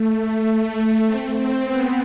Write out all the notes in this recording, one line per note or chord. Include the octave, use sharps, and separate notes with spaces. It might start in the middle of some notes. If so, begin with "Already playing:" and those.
Already playing: A3
C4
C4
B3